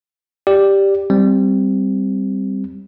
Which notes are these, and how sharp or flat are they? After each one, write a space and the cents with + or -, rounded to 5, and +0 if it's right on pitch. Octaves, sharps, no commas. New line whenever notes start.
G4 +0 D5 +0
G3 +0 C4 +0